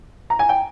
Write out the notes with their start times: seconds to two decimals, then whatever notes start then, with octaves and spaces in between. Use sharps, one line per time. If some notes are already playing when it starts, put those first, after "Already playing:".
0.30 A#5
0.39 G#5
0.49 G5